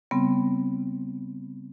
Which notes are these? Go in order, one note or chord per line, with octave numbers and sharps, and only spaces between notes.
C#3 G3 B3 C4